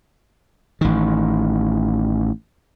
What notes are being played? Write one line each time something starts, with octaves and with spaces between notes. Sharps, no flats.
A1 D#3